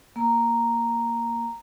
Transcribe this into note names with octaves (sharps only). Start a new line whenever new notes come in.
A#3 A#5